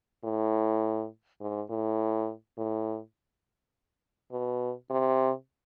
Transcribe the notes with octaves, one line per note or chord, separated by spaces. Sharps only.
A2
G#2
A2
A2
B2
C3